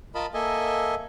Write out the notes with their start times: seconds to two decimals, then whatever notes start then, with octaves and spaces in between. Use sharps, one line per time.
0.15 F4 A#4 D#5 A5 B5
0.34 A#3 A4 D#5 E5 G#5